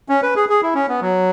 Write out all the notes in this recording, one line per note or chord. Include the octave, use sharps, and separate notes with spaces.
C#4
B4
G#4
G#4
E4
C#4
B3
F#3